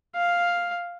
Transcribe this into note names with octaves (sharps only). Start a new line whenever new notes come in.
F5